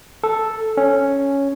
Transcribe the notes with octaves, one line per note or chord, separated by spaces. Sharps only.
A4
C#4